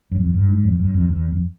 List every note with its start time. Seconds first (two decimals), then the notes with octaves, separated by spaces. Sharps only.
0.11 F#2
0.20 F2
0.34 G2
0.49 G#2
0.64 F2
0.80 F#2
0.94 F2
1.09 E2
1.32 F2